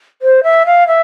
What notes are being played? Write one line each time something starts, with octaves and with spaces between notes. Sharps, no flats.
C5
E5
F5
E5